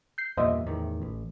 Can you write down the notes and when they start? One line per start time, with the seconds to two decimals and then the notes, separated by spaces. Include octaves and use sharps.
0.18 G6 C7
0.37 E2 G2 A#2 C5 D#5 E5
0.66 E2 A2 D#3
1.02 A1